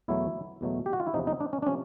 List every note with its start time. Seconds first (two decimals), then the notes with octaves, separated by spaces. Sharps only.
0.08 E2 B2 F#3 A3 E4
0.61 E2 B2 F#3 A3
0.86 G4
0.93 F#4
1.00 F4
1.07 E4
1.14 E2 C3 F3 D#4
1.27 D#4
1.40 D4
1.53 C#4
1.62 D4
1.67 C3 F3 C#4